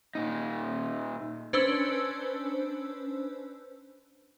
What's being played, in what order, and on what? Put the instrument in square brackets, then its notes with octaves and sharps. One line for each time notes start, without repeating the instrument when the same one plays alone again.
[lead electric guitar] A#2 D#4
[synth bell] C#4 D4 B4 C5 E6